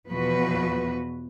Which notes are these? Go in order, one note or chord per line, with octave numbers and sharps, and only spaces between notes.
E2 B2 F3 F#4 B4